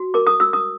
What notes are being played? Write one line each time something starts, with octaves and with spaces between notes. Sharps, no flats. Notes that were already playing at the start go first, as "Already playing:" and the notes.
Already playing: F#4
A#4 D6
D#6
F#4 E6
D#6